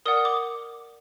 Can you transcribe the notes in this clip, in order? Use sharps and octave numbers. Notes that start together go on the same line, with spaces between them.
A#4 D5 F#5 D#6
D6